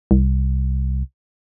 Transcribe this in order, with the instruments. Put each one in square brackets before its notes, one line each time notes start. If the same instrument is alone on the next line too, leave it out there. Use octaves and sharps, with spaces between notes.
[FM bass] C2